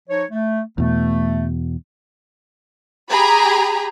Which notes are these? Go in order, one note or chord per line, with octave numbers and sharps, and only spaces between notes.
F3 D#4 C#5
A3
E2 B2 A3
G4 G#4 A#5 B5